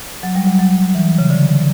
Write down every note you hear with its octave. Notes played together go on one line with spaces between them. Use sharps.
F#3
G3
F#3
F#3
E3
C#3
D3